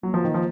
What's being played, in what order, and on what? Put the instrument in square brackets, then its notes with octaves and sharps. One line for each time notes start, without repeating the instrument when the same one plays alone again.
[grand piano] F#3 [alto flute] A#3
[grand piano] F3
D#3
F3